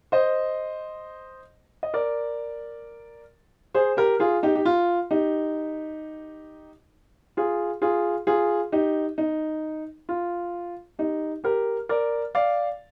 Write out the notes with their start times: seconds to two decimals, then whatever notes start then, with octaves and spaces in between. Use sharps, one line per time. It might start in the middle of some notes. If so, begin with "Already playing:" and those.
0.12 C5 D#5
1.83 D#5
1.94 A#4 D5
3.75 G#4 C5
3.97 G4 A#4
4.20 F4 G#4
4.43 D#4 G4
4.55 G4
4.65 F4
5.11 D#4 G4
7.37 F4 G#4
7.82 F4 G#4
8.27 F4 G#4
8.72 D#4 G4
9.18 D#4
10.09 F4
10.99 D#4 G4
11.44 G4 A#4
11.89 A#4 D5
12.35 D5 F5